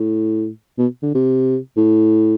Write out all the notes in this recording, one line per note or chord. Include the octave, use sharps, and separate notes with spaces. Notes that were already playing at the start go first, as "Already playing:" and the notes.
Already playing: A2
B2
D3
C3
A2